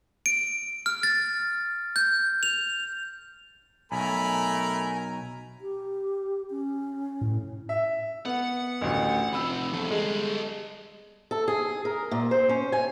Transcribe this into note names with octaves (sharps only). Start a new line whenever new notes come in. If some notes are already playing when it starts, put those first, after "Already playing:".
D7
F6
A6
G6
F7
B1 A3 A#4 G#5 A#5 B5
G4
C#4
A2
E5
B3 F#5
A1 D2
C3 F3 B5 E6
E2 A4
G3 G#3 A4
A4
G#4
A#4
A#2
C5
C#4
G#5